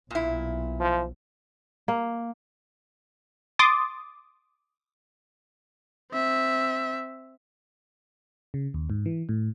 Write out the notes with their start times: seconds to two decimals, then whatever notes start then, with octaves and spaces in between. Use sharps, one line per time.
0.11 B1 A#2 E4
0.80 F3
1.88 A#3
3.59 C6 D6 D#6 A6
6.12 C4 E5
8.54 C#3
8.74 D#2
8.90 G#2
9.06 E3
9.29 A2